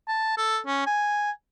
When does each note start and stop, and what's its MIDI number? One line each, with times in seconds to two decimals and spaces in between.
0.08 0.35 81
0.37 0.59 69
0.67 0.86 61
0.86 1.31 80